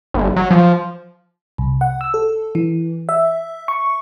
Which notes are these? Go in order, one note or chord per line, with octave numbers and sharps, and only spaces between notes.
G1
F#3
F3
C2
F#5
E6
A4
E3
E5
C#6